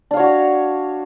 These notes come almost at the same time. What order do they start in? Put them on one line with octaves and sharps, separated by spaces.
D4 F5 C#5 F#4